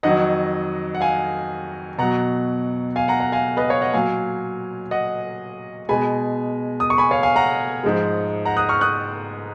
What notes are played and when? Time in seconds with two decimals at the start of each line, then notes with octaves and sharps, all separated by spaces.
0.03 F2 D#3 F#3 D#5 F#5
0.95 F#5
1.01 F5 G#5
1.98 B2 F#3 F#5 A#5
2.96 F5 G#5
3.08 F#5 A#5
3.20 F#5 A#5
3.32 F5 G#5
3.57 B4 D#5
3.69 C#5 F5
3.82 D#5 F#5
3.93 A#2 F#3 F5 G#5
4.91 D#5 F#5
5.89 B2 G#3 G#5 B5
6.80 D#6
6.90 C#6
6.98 G#5 B5
7.11 C#5 F5
7.23 F5 G#5
7.36 F#5 A#5
7.83 G#2 F3 G#3
8.45 F#5 A#5
8.57 D#6 F#6
8.69 C#6 F6
8.81 D#6 F#6